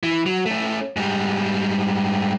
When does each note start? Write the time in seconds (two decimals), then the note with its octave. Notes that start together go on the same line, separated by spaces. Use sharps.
0.03 E3
0.26 F#3
0.46 A3 C#4
0.96 G#2 G3